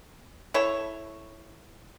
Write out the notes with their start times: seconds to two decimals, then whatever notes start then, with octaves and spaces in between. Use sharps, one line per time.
0.54 E4 A4 C#5